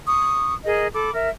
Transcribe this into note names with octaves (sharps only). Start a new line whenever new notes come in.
C#6 D#6
G#4 A#4 D#5
A4 B5 D6
A#4 E5